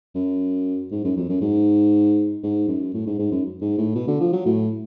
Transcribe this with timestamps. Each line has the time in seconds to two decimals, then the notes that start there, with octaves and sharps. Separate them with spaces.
0.15 F#2
0.91 G#2
1.04 F#2
1.16 F2
1.29 F#2
1.41 G#2
2.43 G#2
2.68 F#2
2.94 A2
3.07 G#2
3.19 G#2
3.32 F#2
3.61 G#2
3.78 A2
3.95 B2
4.07 D3
4.20 F3
4.33 F#3
4.45 A2